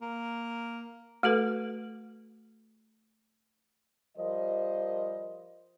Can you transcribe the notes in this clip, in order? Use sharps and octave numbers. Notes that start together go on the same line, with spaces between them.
A#3
A3 F#4 A4 B4
F3 G3 A#4 C5 D#5